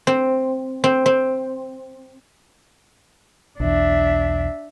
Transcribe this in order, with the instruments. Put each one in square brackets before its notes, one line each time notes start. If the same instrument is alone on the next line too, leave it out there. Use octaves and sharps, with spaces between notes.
[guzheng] C4
C4
C4
[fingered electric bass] B1 E2 [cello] D4 E5